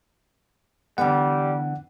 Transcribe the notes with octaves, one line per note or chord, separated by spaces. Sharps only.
D3 E3 G3 B3 F#5